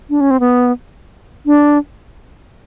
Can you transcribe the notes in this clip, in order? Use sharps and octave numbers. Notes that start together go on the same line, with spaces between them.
D4
C#4
C4
B3
D4